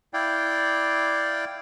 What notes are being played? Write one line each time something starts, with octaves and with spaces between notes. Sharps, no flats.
E4 D5 F5 G5